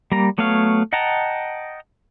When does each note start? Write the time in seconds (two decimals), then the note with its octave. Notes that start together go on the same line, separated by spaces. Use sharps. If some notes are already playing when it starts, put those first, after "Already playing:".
0.12 G3 A#3 A#5
0.38 F#3 A3 B3 C#5 F5
0.93 D#5 F#5 G5 A5 A#5